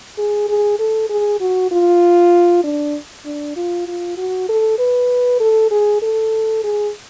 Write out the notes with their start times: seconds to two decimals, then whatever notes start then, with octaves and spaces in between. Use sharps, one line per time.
0.18 G#4
0.49 G#4
0.79 A4
1.09 G#4
1.40 F#4
1.71 F4
2.64 D4
3.25 D4
3.56 F4
3.87 F4
4.17 F#4
4.49 A4
4.79 B4
5.40 A4
5.71 G#4
6.02 A4
6.64 G#4